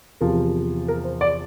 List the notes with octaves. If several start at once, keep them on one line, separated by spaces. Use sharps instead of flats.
E2 C3 F3 A#4
A#4
C5
D5